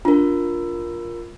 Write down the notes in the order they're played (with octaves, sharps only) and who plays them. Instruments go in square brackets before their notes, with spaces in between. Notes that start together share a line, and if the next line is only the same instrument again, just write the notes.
[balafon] D4 [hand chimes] F4 A#4